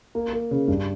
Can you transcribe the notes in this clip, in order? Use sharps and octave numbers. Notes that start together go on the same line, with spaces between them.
A#3
A#3
C#3
G2